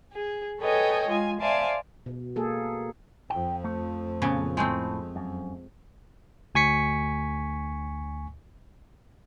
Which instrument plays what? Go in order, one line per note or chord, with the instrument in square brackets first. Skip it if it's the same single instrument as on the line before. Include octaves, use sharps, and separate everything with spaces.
[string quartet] G#4
A4 B4 C#5 D#5 G5 G#5
G#3 F4 G#5
C5 D5 E5 F5 G#5 A5
[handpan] B2
A#3 G#4 A4
[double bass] F2 F3 [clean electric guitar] G5
[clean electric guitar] A3
[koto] A#2 C#3 B3
[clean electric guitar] A2 [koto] G#3 A3 C4
[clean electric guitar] F#2
[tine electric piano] D2 G#5 C#6 B6 C#7